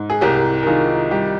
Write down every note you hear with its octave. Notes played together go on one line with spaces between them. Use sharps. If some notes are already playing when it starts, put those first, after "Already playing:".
Already playing: G#2
G#4
C2 G4 A#4
A#4
D#3 F4 G#4
G3 G4